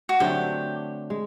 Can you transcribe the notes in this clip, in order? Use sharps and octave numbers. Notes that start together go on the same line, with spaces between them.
F#4
D3 F#3 A3 C4 G4
G#3